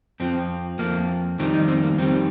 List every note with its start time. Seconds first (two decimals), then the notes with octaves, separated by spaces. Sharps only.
0.20 F2 F3 C4
0.79 F2 F3 A#3
1.39 F2 D#3 G3 C4
1.54 D#4
1.68 C4
1.83 A#3
1.98 F2 D#3 G3 C4